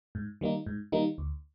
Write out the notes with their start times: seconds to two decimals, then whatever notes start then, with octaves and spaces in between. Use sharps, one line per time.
0.15 G#2
0.41 D#3 G3 A#3 D#4
0.66 G#2
0.92 D#3 G3 A#3 D#4
1.18 D2